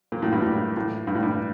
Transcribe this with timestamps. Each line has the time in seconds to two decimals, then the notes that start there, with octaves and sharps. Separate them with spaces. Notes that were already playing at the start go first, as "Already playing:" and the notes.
0.12 A#2
0.22 A2
0.32 G2
0.42 A2
0.77 A2
1.07 G2
1.15 A2
1.23 G2